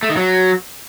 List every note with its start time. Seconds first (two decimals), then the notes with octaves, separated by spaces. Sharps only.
0.03 A3
0.10 D#3
0.17 F#3